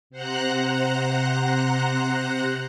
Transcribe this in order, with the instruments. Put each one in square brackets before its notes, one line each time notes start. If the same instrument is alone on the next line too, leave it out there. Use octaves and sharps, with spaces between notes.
[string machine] C3 C5 F#5 A#5 F#6